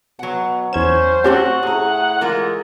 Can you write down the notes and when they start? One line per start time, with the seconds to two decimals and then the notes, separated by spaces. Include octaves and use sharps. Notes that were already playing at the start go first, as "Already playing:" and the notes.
0.19 B2 F#3 F#5
0.73 E2 C#4 C5 G#6 E7
1.24 A3 C4 C#4 F#4 G4 F#5
1.63 A2 G#4 A#5
2.21 E3 G#3 F4 A#4